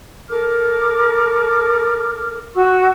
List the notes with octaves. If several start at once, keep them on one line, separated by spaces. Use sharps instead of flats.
A4 A#4 D6 F6
F#4 C#6 E6